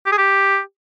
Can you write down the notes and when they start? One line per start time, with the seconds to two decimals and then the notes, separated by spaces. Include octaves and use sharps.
0.06 G4
0.12 G#4
0.18 G4